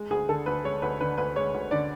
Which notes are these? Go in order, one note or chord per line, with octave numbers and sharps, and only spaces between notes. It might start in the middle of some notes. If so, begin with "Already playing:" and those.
Already playing: G#3
D2 G#4
D3 A4
D2 B4
G#3 C#5
D2 B4
D3 B4
D2 B4
G#3 C#5
D2
D3 D5